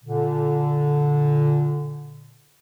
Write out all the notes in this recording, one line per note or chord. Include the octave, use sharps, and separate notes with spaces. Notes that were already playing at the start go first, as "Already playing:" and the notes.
A#2 D3